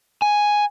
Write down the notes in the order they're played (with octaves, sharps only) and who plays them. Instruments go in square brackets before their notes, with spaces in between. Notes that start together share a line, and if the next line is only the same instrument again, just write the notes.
[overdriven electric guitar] G#5